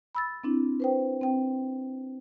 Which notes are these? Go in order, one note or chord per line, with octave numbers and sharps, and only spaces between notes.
B5 E6 A6
C4 D4 E4
B4 C5 G5
C4 G5